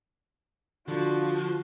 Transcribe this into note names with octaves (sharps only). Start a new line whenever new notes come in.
D3 F3 D4 F#4